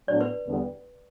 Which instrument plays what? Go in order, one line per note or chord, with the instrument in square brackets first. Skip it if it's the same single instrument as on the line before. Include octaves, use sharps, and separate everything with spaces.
[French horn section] A2 F#3 B3 D4 [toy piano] D5
[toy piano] B4
[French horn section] E2 D3 G3 B3